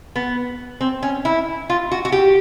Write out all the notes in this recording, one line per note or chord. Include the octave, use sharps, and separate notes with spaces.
B3
C4
C#4
E4
F4
F#4
F#4
G4